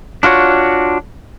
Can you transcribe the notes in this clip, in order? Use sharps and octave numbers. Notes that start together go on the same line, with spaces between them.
D4 F4 F#4 C#5